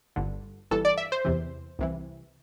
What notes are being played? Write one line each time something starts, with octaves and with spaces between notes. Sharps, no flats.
G1 G2 D3
G1 G2 E3 A4
D5
E5
C5
E2 C3 E3
C2 C3 E3